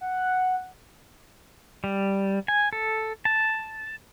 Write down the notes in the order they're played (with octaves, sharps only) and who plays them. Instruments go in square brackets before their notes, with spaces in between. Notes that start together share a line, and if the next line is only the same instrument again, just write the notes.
[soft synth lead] F#5
[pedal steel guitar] G3
G#5
A4
A5